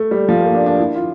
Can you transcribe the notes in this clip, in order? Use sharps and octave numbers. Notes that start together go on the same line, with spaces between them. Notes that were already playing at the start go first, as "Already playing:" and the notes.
Already playing: A3
G3
F3
A#3
D4
D4
E4
F4